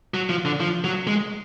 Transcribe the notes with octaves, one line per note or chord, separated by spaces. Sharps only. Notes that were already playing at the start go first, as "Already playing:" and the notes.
F#3
F3
D3
F3
F#3
G#3